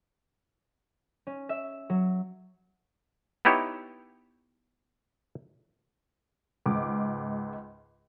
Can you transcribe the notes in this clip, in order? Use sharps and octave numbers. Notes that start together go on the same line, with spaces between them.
C#4
E5
F#3
B3 D#4 E4 G4 C#5
C#2 G#2 D6